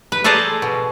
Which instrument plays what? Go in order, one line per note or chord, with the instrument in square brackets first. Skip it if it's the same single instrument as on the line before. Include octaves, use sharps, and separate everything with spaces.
[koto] B4
G#4 A4 C5 D5 A5 A#5
B2